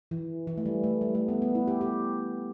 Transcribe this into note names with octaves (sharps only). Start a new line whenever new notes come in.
E3
E3
A3
G3
A3
G3
A3
B3
B3
E4
G4
G4